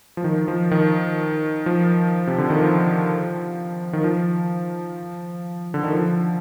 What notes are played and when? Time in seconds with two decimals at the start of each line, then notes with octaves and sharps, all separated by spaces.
0.17 F3
0.24 D#3
0.48 F3
0.71 D#3
1.66 F3
2.27 C3
2.38 D3
2.50 D#3
2.62 F3
3.93 D#3
4.04 F3
5.74 D3
5.83 D#3
5.93 F3